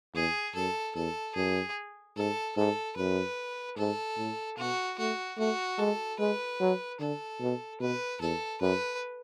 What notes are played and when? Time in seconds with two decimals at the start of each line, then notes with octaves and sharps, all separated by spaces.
0.15 E2 G#4
0.55 F#2 A4
0.95 E2 A4
1.36 F#2 G#4
2.17 G#2 A4
2.57 G#2 A4
2.97 F#2 B4
3.77 G#2 A4
4.18 A2
4.58 B2 F#4
4.98 A3 F#4
5.38 A3 F#4
5.79 G#3 A4
6.19 G#3 B4
6.60 F#3
7.00 D3 A4
7.41 B2
7.80 B2 B4
8.21 E2 A4
8.61 F#2 B4